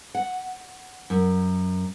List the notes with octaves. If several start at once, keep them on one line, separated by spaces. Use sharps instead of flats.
F#5
F#2